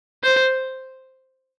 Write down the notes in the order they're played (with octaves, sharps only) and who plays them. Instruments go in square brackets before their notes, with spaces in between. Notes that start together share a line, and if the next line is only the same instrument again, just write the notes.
[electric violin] C5